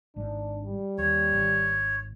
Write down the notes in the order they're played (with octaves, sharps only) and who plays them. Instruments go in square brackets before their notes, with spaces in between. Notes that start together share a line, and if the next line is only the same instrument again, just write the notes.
[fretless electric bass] G#1 G#2 [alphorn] D4
[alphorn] G3
[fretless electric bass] D#2 [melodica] C#5
[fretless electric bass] G#1 D#3